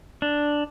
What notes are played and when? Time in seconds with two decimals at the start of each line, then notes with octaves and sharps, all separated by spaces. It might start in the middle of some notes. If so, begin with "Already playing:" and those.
0.22 D4